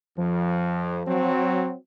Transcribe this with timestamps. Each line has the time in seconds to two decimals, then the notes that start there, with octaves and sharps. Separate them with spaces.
0.17 F2 F3
1.07 F#3 C4